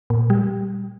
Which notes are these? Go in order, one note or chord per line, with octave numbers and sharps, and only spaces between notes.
A#2
G3